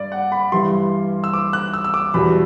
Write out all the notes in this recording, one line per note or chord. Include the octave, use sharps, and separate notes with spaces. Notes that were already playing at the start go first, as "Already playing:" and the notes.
Already playing: G2 D5
F#5
B5
G2 E3 G3 C6
E6
D6
F#6
E6
E6
D6
E2 B2 G3 B5